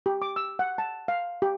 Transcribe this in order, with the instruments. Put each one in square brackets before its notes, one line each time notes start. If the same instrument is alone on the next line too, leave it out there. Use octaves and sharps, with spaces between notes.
[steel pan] G4
D6
E6
F#5
A5
F5
G4